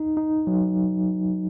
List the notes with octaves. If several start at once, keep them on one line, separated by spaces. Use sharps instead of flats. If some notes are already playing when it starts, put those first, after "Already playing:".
Already playing: D#4
D#4
F#3